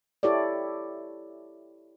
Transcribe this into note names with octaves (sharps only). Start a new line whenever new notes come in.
E4 G4 A4 C#5 D5